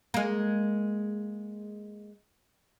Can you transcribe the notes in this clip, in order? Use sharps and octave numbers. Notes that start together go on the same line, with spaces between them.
G#3 A#3